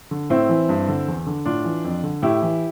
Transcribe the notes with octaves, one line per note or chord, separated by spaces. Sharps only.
D3
A2 C4 E4
E3
G2
D3
E2
D3
A2 D4 F4
E3
F2
D3
A2 E4 G4
E3